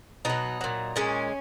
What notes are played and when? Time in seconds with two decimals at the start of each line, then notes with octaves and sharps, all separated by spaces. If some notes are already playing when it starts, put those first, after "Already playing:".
0.25 B2 F#3 D#4
0.61 A#2 F#3
0.96 A#2 G#3 C#4